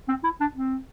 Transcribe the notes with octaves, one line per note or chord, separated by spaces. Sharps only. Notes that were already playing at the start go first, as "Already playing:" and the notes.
C4
E4
D4
C4